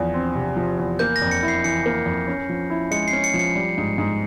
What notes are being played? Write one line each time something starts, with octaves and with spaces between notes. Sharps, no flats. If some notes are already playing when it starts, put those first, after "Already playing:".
Already playing: E2 F3
C4
C3
F3
E2
A#3 G6
A#6
F2
C#7
E4
C7
E3 C#7
A#3
F2
C#4
F3
E4
G#3 C#7
C7
C#4
C#7
F3
C#7
G3
G#2
G#2